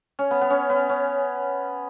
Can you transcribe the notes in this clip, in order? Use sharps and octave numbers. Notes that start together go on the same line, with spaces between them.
C#4
B3
B3
C#4
B3
C#4